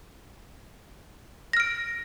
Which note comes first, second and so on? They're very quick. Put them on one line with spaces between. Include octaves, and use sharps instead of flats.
A#6 F6 D7